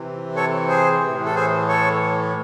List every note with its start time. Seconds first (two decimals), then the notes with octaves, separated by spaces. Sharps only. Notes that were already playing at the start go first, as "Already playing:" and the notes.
Already playing: C3 E3
0.36 A4 C#5
0.68 G#4 C5
1.01 A2 E3
1.24 A4
1.35 G#4 C5
1.69 A4 C#5